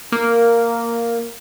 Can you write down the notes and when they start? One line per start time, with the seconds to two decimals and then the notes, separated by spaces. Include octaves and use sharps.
0.12 A#3